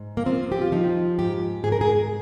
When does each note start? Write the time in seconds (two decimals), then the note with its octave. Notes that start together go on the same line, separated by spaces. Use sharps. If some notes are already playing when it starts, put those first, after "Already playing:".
Already playing: G#2
0.17 A#3
0.26 F3 C4
0.52 G4
0.62 F4
0.72 F3 D#4
1.19 G#2 G4
1.64 G#2 G#4
1.72 A#4
1.81 G#4